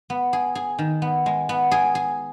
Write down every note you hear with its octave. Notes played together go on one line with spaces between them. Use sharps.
B3
G#4
G#4
D#3
B3
G#3
B3
G#4
G#4